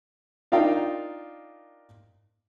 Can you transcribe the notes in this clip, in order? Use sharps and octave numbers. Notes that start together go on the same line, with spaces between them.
D4 D#4 F4 A#4 F5 G5